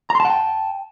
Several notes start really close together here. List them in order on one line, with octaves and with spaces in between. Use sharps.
A#5 C6 A5 F#5 G5